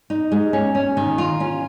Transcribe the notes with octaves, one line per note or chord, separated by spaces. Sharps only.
D#4
G#3
C#4
C#4
D#3
F4
C#4